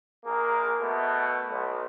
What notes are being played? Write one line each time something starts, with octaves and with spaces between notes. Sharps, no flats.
A#1 A#3 G#4 A#4
B2 A3
B1